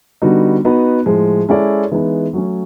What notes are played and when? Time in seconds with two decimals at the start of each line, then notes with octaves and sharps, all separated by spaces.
0.22 D3 G3 B3 D#4 F#4
0.65 B3 D#4 F#4 B4
1.06 A2 F3 G#3
1.49 G#3 C#4 E4 A4 D5
1.92 E3 G#3 B3 D#4
2.33 F#3 A3 C#4